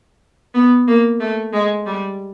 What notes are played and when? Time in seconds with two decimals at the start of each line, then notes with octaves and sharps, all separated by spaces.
0.54 B3
0.88 A#3
1.20 A3
1.53 G#3
1.86 G3